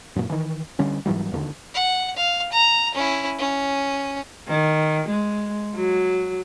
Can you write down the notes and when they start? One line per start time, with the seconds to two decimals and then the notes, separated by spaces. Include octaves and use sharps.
0.16 F#2 A#2
0.30 D#3 E3
0.79 D3 G3 C#4
1.06 G#2 E3 F#3 G3
1.31 E1 D#2 D3
1.74 F#5
2.16 F5
2.52 A#5
2.95 C#4 E4
3.39 C#4
4.48 D#3
5.09 G#3
5.76 F#3